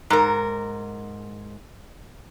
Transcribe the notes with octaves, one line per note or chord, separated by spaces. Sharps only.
G#2 A#4